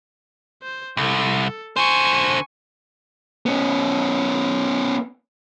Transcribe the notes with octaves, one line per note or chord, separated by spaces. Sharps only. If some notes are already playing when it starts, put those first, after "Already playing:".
C5
C2 A4
D3 C5 G#5 C#6
B3 C#4